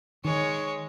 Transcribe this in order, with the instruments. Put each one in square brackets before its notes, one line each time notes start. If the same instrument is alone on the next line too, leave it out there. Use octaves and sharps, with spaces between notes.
[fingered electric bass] D#3 [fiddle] G#3 C#5